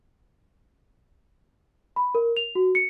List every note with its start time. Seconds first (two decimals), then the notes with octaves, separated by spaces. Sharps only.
1.96 B5
2.15 A#4
2.37 F7
2.55 F#4
2.75 C#7